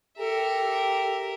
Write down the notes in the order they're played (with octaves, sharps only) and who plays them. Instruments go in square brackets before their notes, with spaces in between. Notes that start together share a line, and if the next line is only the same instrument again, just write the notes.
[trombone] G4 [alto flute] A4 [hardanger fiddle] A#4 E5